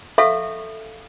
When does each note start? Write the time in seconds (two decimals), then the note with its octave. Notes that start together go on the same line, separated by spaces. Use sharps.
0.18 A4 E5 F5 C#6